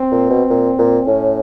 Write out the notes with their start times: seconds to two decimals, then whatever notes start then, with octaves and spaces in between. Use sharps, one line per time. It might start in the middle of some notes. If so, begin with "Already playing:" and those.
Already playing: C4
0.11 A#2
0.30 B2
0.50 A#2
0.78 A#2
1.06 A2 C#4